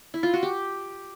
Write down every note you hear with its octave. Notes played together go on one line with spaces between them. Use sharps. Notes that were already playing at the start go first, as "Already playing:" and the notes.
E4
F4
F#4
G4